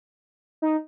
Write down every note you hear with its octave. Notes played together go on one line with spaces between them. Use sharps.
D#4